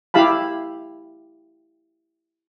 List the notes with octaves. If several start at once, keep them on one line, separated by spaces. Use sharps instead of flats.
E4 G4 F5 A5 B5